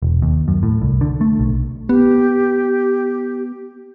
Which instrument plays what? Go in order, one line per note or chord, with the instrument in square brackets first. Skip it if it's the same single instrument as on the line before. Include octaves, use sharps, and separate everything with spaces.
[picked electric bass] E1
D#2
F#2
A2
C2
D3
A3
B1
[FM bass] B3 [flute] G4